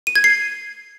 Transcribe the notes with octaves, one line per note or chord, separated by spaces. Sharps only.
D#7
G#6
C7